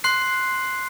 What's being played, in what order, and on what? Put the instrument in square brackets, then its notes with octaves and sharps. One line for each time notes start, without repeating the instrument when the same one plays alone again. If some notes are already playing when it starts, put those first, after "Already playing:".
[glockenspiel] C6 F#6 C7